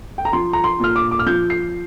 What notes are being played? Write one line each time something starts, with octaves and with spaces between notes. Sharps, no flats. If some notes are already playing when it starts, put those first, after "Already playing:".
G5
A#5
F3 C6
A#5
C6
A#2 F6
D6
D6
F6
F3 G6
C7